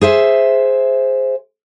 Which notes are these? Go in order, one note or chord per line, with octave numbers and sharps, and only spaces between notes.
G#4 C5 E5